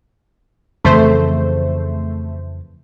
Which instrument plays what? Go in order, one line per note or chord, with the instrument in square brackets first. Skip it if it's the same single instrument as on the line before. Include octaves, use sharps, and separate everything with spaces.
[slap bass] F2 C#3 E3 [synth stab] A3 C5